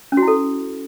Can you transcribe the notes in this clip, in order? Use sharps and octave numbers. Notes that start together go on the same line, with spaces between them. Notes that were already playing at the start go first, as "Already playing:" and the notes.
C#4
F#4
E4
A4